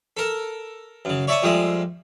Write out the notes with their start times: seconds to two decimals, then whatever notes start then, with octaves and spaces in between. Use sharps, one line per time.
0.17 A4 A#4 A5
1.05 F#2 C#3
1.28 C#5 D5 E5 A5 C#6 D#6
1.43 F2 F3 G3 G#3 E5 D#6